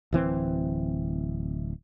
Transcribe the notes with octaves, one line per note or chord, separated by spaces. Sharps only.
D1 E3 C4